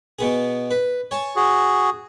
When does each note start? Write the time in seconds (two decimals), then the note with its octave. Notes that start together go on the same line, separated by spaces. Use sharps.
0.19 B2 B3 G#4
0.71 B4
1.11 C#5 G#5 A5
1.36 F#4 G#4